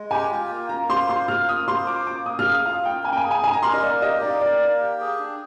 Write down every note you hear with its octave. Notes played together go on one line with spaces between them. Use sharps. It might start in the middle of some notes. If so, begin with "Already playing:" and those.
Already playing: G#3
G4 G#5
F4
A#3
A#3 A#5
C5 C6
F4 C6
A#3 F6
A#3 D#6
C5 C6
F4 D6
A#3 D6
A#3 D#6
F6
G#4
D#6
F4 F5
A#3 G5
A#3 G#5
G5
G#5
G#4
G#5
D#4 G#5
A#5
A#4 C6
D#5
A#3 D5
G4 D#5
D#4 D5
A#4 D5
A#3
G4
G#4
D4